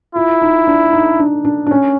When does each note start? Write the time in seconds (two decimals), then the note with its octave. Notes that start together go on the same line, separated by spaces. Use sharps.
0.15 E4 F4
0.42 D#4
0.67 D4
0.93 D#4
1.19 D4
1.45 D4
1.67 D4
1.71 C#4